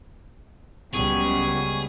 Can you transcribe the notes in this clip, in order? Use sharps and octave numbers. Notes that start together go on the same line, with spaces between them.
C#2 F#3 G3 B3 G#4 C#6